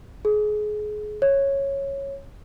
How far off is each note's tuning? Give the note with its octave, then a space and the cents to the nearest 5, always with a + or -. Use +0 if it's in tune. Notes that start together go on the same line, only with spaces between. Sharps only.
G#4 +30
C#5 -10